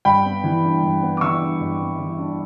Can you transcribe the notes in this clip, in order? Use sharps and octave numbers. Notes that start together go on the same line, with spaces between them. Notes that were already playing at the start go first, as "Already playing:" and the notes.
G2 G5 B5
B3
E3
D4
G2
B3
D6
E3 C#6 E6
D4
G2
B3
E3
D4